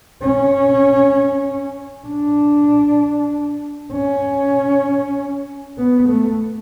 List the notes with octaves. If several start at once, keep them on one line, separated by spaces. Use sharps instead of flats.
C#4
D4
C#4
B3
A3